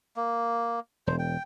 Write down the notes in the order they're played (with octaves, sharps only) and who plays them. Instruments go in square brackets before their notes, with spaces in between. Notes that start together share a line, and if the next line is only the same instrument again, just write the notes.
[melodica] A#3
[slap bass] E1 [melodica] C5
[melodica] G5